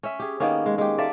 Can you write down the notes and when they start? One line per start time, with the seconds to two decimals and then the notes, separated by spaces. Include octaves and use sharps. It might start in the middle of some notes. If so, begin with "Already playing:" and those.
0.03 C#4 E5
0.19 G4 G#4
0.40 D#3 A#3 B3 C#4
0.66 G#3
0.78 G#3 G4
0.98 A#3 A4 D5 E5